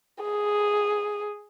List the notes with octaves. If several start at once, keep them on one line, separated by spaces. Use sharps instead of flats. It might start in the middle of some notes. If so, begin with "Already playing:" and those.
G#4